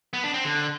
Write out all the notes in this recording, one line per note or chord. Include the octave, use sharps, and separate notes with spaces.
B3
D4
C4
D3